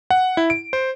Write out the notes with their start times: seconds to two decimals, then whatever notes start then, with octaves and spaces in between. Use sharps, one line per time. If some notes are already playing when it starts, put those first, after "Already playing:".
0.11 F#5
0.37 E4
0.50 D7
0.73 C5